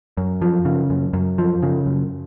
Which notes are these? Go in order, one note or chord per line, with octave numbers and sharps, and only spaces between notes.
F#2
F3
C#3
F#2
F#2
F3
C#3
F#2